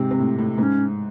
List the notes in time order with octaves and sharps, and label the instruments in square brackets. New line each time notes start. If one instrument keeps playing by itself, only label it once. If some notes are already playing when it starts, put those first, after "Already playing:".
Already playing: [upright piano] G#2 C3 [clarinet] C4
[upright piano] C3
A2
A2
[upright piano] G#2 [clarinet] C#4